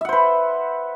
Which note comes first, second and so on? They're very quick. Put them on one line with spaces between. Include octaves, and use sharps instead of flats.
E5 F#5 C5 B4